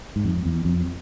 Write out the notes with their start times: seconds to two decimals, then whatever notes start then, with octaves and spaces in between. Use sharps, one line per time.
0.16 G#2
0.25 F2
0.45 E2
0.65 F2